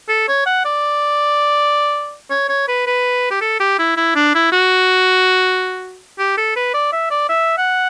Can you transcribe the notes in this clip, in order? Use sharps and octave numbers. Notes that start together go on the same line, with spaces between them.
A4
C#5
F#5
D5
C#5
C#5
B4
B4
G4
A4
G4
E4
E4
D4
E4
F#4
G4
A4
B4
D5
E5
D5
E5
F#5